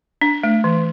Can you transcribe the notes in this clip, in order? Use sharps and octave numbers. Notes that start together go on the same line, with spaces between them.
D4
A3
E3